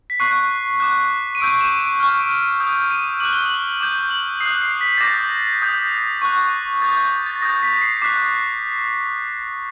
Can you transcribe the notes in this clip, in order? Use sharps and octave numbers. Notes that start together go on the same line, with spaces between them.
B6
C#6 F#6 C7
D6 F#6
D#7
C#6 E6 G6 D7
E7
D7
C#6 F6
D#6 G6
D#7
D6 F#6 F#7
G7
F#7
D6 G6
F#7
D#6 C7
F#6
C7
B6
A6
D6 G6 A#6
D#6 G6
C#6 F#6
D#6 G6 A6
G6
A6
D#6 G6 A#6
B6
C7
C7
D6 F#6 B6